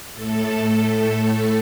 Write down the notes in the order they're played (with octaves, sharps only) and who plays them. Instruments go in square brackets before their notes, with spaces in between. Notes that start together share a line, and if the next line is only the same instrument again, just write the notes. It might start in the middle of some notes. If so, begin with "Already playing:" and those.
[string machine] A2 A3 A4